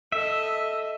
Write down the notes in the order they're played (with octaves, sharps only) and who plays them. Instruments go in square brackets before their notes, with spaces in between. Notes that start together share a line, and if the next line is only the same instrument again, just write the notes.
[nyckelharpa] A4 D#5 [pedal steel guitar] E5